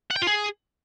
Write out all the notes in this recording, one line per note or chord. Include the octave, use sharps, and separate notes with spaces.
F#5
G5
F4
G#4